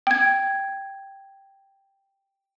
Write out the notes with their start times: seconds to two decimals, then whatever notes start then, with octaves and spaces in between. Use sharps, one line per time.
0.07 G5 G#6